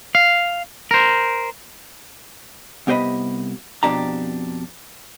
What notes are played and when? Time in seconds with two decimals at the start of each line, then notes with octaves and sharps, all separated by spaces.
0.15 F5
0.91 A#4 C5
2.87 C2 B3 G4 C5 D#5 B5
3.83 F2 B2 D4 G4 A#5